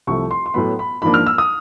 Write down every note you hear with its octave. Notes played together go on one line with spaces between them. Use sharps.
C2 C3 F3 A3 C#6
C6
C6
A2 F#3 B3 B5
B5
G#2 F3 A#3 D4 B5
F6
E6
D#6